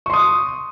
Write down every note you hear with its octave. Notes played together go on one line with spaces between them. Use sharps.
C6 C#6 D#6